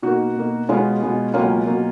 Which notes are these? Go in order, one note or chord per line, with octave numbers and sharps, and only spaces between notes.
B2 A#3 D#4 F#4
B2 A#3
B2 G#3 B3 C#4 F4
B2 G#3 B3
C#2 B2 F#3 A#3 C#4 F4
B2 F#3 A#3